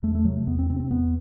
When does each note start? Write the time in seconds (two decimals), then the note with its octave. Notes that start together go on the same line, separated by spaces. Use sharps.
0.03 E2 A3
0.15 A3
0.25 C3 F#3
0.37 A3
0.47 E2 B3
0.59 C4
0.69 C3 C4
0.80 C4
0.91 E2 B3